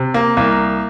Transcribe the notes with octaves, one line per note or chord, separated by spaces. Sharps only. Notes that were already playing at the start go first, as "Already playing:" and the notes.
Already playing: C3
A#3
C2 A#3